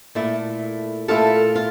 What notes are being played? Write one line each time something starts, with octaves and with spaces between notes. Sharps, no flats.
A#2 A3 E4
A#2 A3 E4 F4 A4
F4